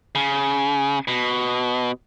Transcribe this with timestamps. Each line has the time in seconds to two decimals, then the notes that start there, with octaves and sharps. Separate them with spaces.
0.15 C#3
1.08 B2